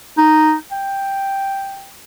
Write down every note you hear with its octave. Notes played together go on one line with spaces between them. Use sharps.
D#4
G5